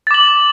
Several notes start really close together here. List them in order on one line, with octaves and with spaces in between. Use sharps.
A6 D6 F#7